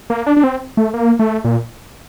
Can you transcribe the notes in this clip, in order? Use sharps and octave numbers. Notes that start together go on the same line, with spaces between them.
A#3
D4
D4
C4
A3
A#3
A3
A#2